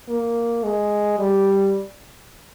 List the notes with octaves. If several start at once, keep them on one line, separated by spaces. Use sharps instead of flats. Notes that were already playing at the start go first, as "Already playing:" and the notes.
A#3
G#3
G3